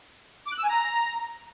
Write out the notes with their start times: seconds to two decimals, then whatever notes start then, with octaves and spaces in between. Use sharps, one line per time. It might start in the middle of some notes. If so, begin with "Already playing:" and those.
0.47 D6
0.52 F#6
0.58 E6
0.63 G#5
0.69 A#5